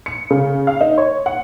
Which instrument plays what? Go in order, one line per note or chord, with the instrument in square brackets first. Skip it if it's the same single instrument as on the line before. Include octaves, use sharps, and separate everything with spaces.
[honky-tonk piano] C#7
C#3
F5
D#4
C#5
F#5